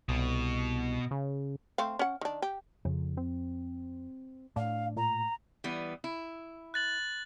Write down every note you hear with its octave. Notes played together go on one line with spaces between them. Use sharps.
C2 B2
C#3
A3 C4 F5
C#4 F#5
D#3 D4
G4
F2 C#3
C4
A2 D4 F5
A#2 A#5
E3 G3 B3
E4
F#6 A6 F#7